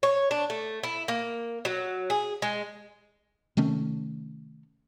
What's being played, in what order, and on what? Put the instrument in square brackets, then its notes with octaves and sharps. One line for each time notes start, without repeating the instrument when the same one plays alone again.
[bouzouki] C#5
D4
A3
E4
A#3
F#3
G#4
G#3
[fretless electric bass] C3 D#3 A3 C#4